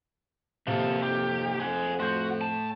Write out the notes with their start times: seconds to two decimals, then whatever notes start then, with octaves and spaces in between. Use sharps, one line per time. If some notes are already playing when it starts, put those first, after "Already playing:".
0.67 D#2 G#2 C3 F3 A#3 A4
1.03 F2 G4
1.60 F2 G#4 F#5
2.00 A2 F#4 C6 G6
2.41 A5